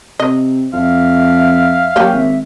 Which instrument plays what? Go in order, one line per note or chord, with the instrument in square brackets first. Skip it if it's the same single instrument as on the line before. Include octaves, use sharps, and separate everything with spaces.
[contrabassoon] C3 [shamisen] D#5
[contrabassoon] F2 [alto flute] E5 [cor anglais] F5
[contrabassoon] F#2 [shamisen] A#3 C#4 G4 [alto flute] G5
[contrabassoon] G#1 [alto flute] E5